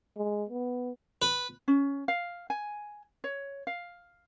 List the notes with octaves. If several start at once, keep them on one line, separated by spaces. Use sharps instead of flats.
G#3
B3
B4
C#4
F5
G#5
C#5
F5